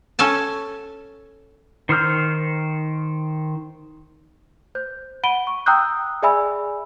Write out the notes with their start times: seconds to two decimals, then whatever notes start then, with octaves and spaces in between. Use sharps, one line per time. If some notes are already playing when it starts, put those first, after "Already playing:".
0.19 C#4 A4 G#5 A5
1.89 D#3 C5 C#5 F6 G6
4.75 C5 G6
5.23 F#5 B5 D7 D#7 G7
5.47 C#6
5.66 G5 A#5 D#6 E6 F#6 G6
6.22 G#4 D5 E5 G#5 B5 E6